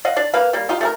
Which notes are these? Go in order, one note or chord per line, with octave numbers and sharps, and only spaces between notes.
D#5 F5 F#5
D4 D5
A#3 B4 F5
G3 A#3
D#4 F4 G4
A3 G#4 A#4